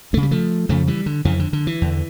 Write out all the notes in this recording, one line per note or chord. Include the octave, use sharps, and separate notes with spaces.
D2 C#3 A3
G3
F3 A3
F2 C#3 F3 A3
E3 G3
D3
F2 C#3 E3
D3
D3
E3
E2 D3